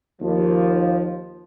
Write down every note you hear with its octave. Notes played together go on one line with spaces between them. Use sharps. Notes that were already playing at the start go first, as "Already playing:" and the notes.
D#2 F3